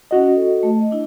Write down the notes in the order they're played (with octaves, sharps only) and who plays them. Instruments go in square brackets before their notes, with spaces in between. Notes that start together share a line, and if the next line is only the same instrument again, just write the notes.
[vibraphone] C#4 E4 F#5 [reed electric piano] F#4 D#5
[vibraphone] A4
A3
D#5
D4 E4